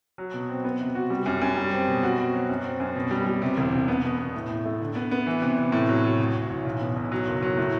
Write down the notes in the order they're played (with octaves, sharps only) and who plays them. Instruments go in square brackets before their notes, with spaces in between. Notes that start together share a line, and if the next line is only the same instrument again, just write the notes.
[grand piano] F#3
B2
C4
B3
C3
F#4
G3
F#2
F#2
G3
C4
B2
F#4
C4
F#3
F#2
C4
F#2
B2
G3
G3
C3
E1
C3
B3
B2
B2
A2
A2
A3
D3
B3
B3
E3
C3
C3
A2
F#3
F#3
A1
A1
A1
B1
B2
B1
F#3
F#1
F#3
A2